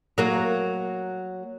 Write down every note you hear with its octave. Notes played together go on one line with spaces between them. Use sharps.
F#3 A#3